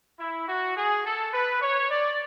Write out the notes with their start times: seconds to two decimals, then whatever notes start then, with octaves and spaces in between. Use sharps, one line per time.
0.19 E4
0.48 F#4
0.76 G#4
1.05 A4
1.33 B4
1.61 C#5
1.90 D5